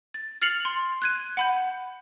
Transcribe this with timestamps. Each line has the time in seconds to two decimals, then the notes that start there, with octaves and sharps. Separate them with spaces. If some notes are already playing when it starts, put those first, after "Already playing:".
0.14 A6
0.42 F6 A6 C7 C#7 F7 F#7
0.65 C6
1.02 F#6 G#6 D#7
1.37 F#5 B5 G6